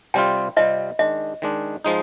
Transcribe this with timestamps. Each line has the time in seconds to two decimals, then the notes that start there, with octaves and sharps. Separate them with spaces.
0.14 C3 G3 C4 F4 G5
0.57 C3 G3 C4 F4 D#5
0.99 D#3 G#3 D4 D#5
1.42 D#3 G#3 D4
1.85 F3 G#3 D#4